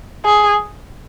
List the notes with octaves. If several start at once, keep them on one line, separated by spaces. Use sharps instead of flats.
G#4